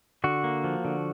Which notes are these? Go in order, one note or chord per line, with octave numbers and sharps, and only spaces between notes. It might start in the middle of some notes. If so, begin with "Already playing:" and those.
D3 F#4
A#3
F3
D3